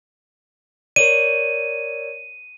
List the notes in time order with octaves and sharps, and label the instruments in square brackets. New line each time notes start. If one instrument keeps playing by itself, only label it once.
[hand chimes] A#4 C#5 D5 [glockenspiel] D#7